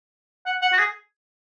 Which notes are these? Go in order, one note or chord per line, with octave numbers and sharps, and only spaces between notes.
F#5
F#5
F#4
G#4